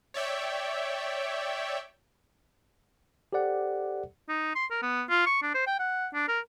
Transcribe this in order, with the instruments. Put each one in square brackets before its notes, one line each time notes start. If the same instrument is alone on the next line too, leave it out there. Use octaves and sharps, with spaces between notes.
[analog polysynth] C#5 D5 E5 G5
[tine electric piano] G4 A4 C5 D5 F#5
[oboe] D#4
C6
A#4
B3
F4
C#6
D4
C5
G5
F#5
D4
A#4